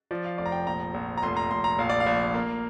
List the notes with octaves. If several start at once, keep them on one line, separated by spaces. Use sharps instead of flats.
F3 D5
F5
F1 D5
A#5
G5
A#1 A#5
A#1
A#5
F1 C6
A#5
F1 C6
A#5
A#1 F5
D5
F5
A#1
A#3